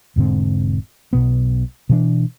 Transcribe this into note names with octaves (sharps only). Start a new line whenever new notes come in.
E1 G#2 D3 C4
B1 B2 B3
B2 E3 D4